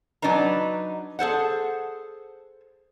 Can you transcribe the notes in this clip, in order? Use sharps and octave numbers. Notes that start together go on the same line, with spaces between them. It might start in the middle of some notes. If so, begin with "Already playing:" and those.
F#3 D4 D#4 B4 A#5
G#4 A4 C5 F#5